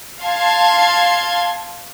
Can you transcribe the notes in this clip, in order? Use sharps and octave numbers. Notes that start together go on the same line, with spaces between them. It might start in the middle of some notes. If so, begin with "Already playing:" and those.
F5 A5 C6 G#6